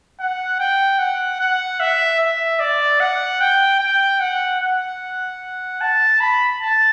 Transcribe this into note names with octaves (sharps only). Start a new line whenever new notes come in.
F#5
G5
F#5
F#5
E5
E5
D5
F#5
G5
G5
F#5
F#5
A5
B5
A5